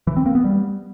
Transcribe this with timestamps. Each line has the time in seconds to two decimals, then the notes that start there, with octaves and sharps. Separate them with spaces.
0.07 E3
0.17 C4
0.26 A#3
0.35 B3
0.44 G3